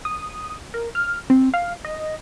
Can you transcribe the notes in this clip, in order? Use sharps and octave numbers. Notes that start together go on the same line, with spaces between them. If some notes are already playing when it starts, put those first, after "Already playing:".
D#6
A#4
F6
C4
F5
D#5